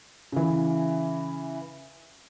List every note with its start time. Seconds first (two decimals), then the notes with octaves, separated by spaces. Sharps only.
0.32 C#3 E3